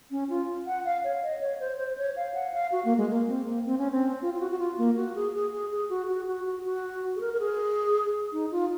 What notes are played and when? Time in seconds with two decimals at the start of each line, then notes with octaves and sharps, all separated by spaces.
0.11 C#4
0.30 F4
0.67 F#5
0.85 F5
1.04 C#5
1.22 D#5
1.41 C#5
1.60 C5
1.78 C5
1.98 C#5
2.16 F5
2.34 F#5
2.54 F5
2.72 F#4
2.85 A#3
2.98 G#3
3.10 A#3
3.28 C4
3.46 A#3
3.66 C4
3.78 C#4
3.91 C4
4.22 F4
4.34 F4
4.40 F#4
4.51 F#4
4.59 F4
4.78 A#3
4.96 F#4
5.15 G#4
5.34 G#4
5.52 G#4
5.71 G#4
5.90 F#4
6.08 F#4
6.27 F#4
6.46 F#4
6.64 F#4
7.16 G#4
7.21 A#4
7.34 A#4
7.40 G#4
8.33 D#4
8.52 F4